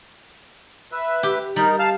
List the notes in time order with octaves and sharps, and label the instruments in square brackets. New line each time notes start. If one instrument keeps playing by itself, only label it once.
[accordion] B4 E5
[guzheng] G4
[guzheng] G3 [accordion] D#4 A#4
[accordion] F5 A5 F6